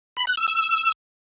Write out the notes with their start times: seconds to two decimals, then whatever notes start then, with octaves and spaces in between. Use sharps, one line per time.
0.17 B5
0.27 F#6
0.37 E6
0.48 E6